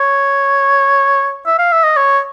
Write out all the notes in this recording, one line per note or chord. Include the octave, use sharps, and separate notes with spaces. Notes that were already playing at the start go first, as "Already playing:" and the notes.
Already playing: C#5
E5
F5
E5
D#5
C#5